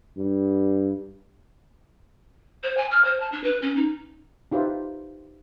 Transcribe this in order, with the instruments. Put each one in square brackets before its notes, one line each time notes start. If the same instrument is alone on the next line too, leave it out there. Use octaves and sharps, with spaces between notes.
[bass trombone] G2
[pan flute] C5
G#5
F6
C5
A5
D4
B4
C#4
D#4
[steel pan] D#4 F4 G4 B4 C5 E5